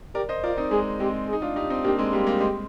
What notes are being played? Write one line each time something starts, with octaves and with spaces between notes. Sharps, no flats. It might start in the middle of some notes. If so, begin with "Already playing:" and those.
G4 A#4 D5
C5 D#5
F4 A#4 D5
C4 D#4
G#3 G#4
G#3 C4 G4
G#4
D#4
D4 F4
D#4 G4
C4 D#4
A#3 D4 G4
G#3 C4
G3 A#3 G4
G3 A#3
G#3 C4